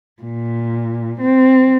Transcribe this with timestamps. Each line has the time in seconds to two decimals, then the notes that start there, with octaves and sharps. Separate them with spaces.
0.22 A#2
1.20 C4